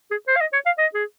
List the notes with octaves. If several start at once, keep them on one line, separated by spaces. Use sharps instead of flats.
G#4
C5
F5
D#5
C#5
F5
D#5
G#4